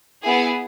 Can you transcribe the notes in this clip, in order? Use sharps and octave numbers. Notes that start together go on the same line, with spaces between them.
B3 E4 G#4